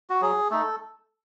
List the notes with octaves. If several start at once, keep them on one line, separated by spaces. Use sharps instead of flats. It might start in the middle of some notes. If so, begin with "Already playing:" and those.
F#4
F#3 G#4
A3 D#4 A4